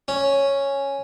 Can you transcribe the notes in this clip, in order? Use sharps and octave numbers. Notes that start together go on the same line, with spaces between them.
C#4